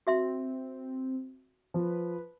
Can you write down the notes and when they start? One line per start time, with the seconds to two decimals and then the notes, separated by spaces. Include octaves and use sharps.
0.07 C4 F#4 E5 C6
1.74 F3 B4